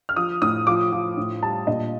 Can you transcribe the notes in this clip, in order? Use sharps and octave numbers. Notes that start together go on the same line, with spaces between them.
F6
F3 D#6
A2 D#6
F3 D6
F3
A2
G3 A5
A#2 D#5